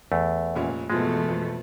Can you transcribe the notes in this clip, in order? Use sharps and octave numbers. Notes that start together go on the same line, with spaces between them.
E2 A3
F1 A#2 C#4
F2 G#2 B2 E3 F3 G#3 A3
F2